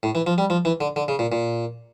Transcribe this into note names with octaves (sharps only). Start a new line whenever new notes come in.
A2
E3
F3
G3
F3
E3
D3
D3
C#3
A#2
A#2